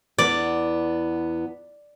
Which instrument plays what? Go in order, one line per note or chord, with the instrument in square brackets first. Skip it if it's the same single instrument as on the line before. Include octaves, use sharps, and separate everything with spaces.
[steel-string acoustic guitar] E2 B3 [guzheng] D5